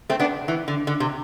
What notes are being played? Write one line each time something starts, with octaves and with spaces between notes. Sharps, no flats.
A3 C4
B3 D4
E3
D3
D3
C3